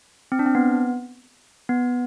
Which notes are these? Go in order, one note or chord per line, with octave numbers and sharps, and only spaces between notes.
C4
D4
C4
B3
B3